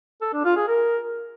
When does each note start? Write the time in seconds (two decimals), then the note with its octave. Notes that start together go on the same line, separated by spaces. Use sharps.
0.21 A4
0.33 D4
0.44 F4
0.56 G#4
0.67 A#4